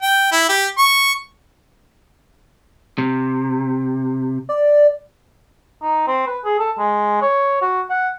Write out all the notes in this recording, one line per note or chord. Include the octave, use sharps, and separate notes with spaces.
G5
E4
G4
C#6
C3
D5
D#4
C4
B4
G#4
A4
G#3
C#5
F#4
F#5